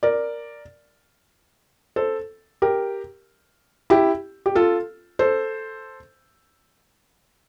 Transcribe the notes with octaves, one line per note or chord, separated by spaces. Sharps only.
A#4 D5
A4 C5
G4 A#4
E4 G4
G4
F4 A4
A4 C5